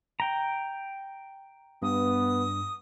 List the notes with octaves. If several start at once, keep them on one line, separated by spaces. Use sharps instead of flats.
G5 A#5
G2 B3 D#6